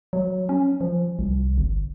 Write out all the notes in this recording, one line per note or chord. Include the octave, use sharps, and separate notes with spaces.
F#3
C#4
F3
C2
G1